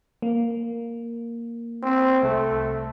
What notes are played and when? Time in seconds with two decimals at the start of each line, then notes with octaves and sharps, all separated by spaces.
0.22 A#3
1.83 C4
2.23 C2 A3